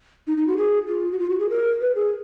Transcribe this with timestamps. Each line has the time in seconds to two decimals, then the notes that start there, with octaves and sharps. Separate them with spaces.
0.27 D#4
0.37 D#4
0.47 F#4
0.57 G#4
0.88 F4
1.12 F#4
1.19 F4
1.29 F#4
1.39 G#4
1.50 A#4
1.81 B4
1.95 G#4